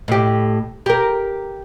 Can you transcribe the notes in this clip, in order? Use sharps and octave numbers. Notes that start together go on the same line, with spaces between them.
A2 G4
G4 A#4